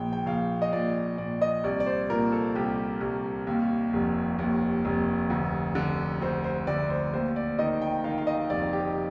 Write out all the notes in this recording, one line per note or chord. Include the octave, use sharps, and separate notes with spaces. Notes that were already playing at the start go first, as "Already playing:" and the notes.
Already playing: A#1 G5
G5
A#1 F5
D#5
A#2 D5
A#2 D5
D#5
C2 D5
D5
C5
A#2 A#4
A4
C2 G4
C2
D#2
F1
D#2
F1
D2
D3
D2 C5
C5
D2 D5
C5
D#2 C5
D5
D#3 D#5
G5
D#3 F5
F5
D#5
F1 D5
G4